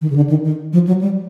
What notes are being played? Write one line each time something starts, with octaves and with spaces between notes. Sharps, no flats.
D#3
C#3
D3
D#3
D#3
F3
F#3
G3